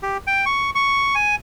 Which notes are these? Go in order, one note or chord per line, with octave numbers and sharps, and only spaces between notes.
G4
G5
C#6
C#6
G#5